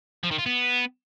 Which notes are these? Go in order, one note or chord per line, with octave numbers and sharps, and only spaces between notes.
F3
D#3
F4
B3